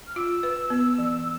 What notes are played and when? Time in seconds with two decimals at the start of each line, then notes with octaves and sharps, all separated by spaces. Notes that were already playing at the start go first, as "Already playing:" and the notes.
0.07 F6
0.16 F4 E6
0.43 B4
0.70 B3
0.98 E3